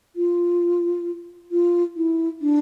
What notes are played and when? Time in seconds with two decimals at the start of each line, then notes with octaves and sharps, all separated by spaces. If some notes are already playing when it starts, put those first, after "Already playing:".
0.16 F4
1.52 F4
1.96 E4
2.42 D4